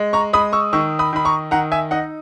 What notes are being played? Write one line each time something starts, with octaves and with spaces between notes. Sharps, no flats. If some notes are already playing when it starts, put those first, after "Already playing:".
Already playing: G#3
A#5 C#6
G#3 B5 D#6
C#6 E6
D#3 C#6 E6
B5 D#6
D#3 B5
A#5 C#6
D#3 F#5 A#5
E5 G#5
D#4 D#5 F#5